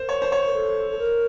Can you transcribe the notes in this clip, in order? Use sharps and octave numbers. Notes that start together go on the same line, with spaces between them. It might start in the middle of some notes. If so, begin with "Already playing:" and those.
Already playing: A#4 C5
C#5
C5
C#5
A#4
A4
A4
A#4